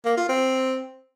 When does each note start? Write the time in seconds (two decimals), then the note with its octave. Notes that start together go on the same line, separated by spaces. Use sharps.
0.05 A#3
0.17 F4
0.29 C4